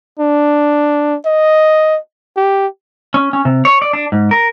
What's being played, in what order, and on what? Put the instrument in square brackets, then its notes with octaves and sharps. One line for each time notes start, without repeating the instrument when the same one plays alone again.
[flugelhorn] D4
D#5
G4
[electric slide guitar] C#4
C#4
C3
C#5
D5
D4
G#2
A#4